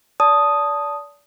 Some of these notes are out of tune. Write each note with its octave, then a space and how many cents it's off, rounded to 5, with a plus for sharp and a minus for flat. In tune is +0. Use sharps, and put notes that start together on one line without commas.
D5 -30 A5 +0 D#6 +0